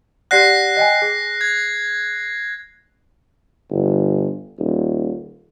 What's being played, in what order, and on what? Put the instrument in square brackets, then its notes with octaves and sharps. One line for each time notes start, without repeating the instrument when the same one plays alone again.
[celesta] G4 D5 F#5 [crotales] F#6 A#6 C7
[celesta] D#5 G5 G#5
G#4
[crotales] G#6
[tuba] G1
D#1